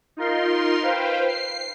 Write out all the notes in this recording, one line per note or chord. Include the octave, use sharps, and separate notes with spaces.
D#4 F4 A#4 C6
B4 C5 F5 G5
C7